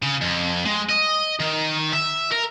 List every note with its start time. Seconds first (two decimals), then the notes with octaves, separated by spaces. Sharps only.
0.02 C#3
0.21 F2
0.65 G#3
0.89 D#5
1.40 D#3
1.93 E5
2.31 A#4